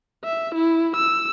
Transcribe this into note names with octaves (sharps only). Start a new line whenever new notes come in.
E5
E4
E6